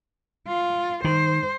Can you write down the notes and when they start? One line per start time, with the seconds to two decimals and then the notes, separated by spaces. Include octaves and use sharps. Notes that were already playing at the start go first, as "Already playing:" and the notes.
0.48 F4
1.04 D#3 C5